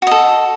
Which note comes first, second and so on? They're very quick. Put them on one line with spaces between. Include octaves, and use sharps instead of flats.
F#4 D#5 A4